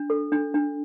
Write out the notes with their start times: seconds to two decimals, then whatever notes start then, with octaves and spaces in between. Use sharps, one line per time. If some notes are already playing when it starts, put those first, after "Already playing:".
Already playing: D4
0.10 A4
0.32 D4
0.54 D4